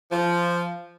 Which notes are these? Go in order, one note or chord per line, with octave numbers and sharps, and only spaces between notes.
F3